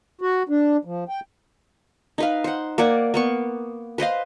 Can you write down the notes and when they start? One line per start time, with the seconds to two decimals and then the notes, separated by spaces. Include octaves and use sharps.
0.21 F#4
0.49 D4
0.85 F3
1.09 G5
2.18 D#4 B4 F5
2.44 C5 F#5
2.78 A#3 D5 F#5 G#5
3.14 A#3 B3 C#6
3.98 B4 C5 D#5 F5